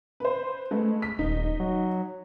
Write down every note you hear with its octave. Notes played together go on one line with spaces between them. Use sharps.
B4 C5
G#3 A3 B4
B6
D#1 D#4
F#3